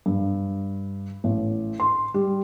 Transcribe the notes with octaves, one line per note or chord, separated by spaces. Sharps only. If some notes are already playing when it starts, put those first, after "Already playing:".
G2
A1
C6
G3